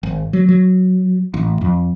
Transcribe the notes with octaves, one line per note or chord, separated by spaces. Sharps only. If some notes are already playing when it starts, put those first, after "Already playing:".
G#1
F#3
F#3
A1
F2